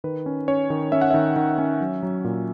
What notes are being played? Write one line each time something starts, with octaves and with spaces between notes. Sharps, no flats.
D#3 B4
C#4
C#4 C#5
D#3
C#4 E5
F#5
D#3 E5
D#3
C#4
F#3
F#3
A#2